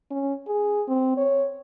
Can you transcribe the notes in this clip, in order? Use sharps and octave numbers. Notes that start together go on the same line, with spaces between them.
C#4
G#4
C4
C#5